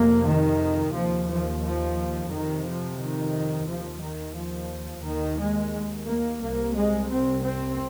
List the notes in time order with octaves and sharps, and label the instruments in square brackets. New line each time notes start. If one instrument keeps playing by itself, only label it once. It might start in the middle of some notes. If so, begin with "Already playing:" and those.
Already playing: [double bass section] F2 C3 A#3
D#3
D#2 F3
F3
F3
F2 C3 D#3
F3
D#3
D#2 F3
D#3
F3
D#2 D#3
G#3
A#3
C2 C3 A#3
G#3
C4
C4